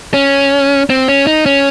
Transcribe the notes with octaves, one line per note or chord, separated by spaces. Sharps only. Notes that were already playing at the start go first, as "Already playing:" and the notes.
C#4
C4
C#4
D#4
C#4